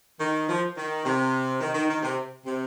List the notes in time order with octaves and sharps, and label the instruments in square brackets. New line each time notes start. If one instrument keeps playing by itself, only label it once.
[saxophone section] D#3
F3
D#3
C3
D#3
D#3
D#3
C3
C3